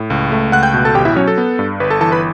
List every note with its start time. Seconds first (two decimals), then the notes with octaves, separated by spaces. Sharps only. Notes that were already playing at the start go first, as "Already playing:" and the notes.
Already playing: A2
0.10 C#2
0.32 A3
0.52 C#2 F#5 F#6
0.63 G5 G6
0.74 B2
0.85 A4 A5
0.95 A1 G4 G5
1.05 E4 E5
1.16 F#3 C#4 C#5
1.27 A4
1.38 B3
1.59 G2
1.80 G1 B4
1.90 A4 A5
2.01 E3 A4 A5
2.12 B4 B5